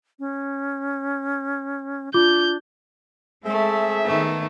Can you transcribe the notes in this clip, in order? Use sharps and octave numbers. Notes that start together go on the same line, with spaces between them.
C#4
D4 F4 D6 G6
G#3 A3 C4 G#4 E5
D#3 A3 B3